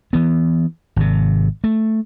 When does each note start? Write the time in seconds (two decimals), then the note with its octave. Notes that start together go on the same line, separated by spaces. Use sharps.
0.13 E3 B3
0.96 G#1 C3
1.64 A3